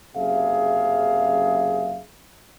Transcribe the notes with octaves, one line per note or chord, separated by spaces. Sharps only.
F#1 F#2 C3 G#4 E5 F5